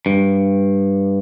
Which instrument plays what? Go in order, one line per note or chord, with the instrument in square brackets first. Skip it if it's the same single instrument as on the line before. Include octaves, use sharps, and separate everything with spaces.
[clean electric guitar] G2